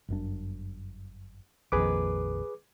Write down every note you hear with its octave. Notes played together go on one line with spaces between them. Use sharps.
G1 F#2 D4
A#1 F2 D#3 G#4 B4 D6